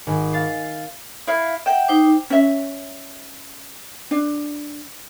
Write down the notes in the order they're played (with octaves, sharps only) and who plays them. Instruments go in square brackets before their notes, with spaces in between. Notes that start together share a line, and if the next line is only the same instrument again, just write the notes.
[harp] G#1
F5 A6 C7
[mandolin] E4 F5
[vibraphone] E5 F#5 [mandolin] G5
[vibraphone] D#4 C5 D6
[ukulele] C#4 E5
D4